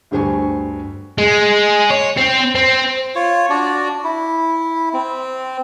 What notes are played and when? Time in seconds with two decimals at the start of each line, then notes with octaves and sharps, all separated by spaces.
0.11 D2 G2 G4 C5 G#5 C#6
1.18 G#3
1.90 C#5
2.17 C4
2.55 C4
3.15 F4 C#5
3.50 D4 F#4 D5
4.04 E4
4.93 C4